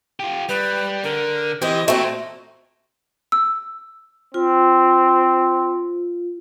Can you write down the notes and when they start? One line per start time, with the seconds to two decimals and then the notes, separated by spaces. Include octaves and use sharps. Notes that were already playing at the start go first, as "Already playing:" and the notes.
0.20 F4 G4
0.49 G3 B4
1.04 D3 A#4
1.62 E3 C4 G4 D#5
1.88 A#2 A3 C4 F#4
3.32 E6
4.34 C4 F4